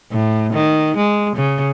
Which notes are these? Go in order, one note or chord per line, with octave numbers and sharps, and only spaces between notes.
A2
D#3
G#3
C#3